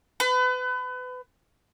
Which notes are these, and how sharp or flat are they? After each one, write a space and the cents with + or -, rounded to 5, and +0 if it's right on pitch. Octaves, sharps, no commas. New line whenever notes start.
B4 +30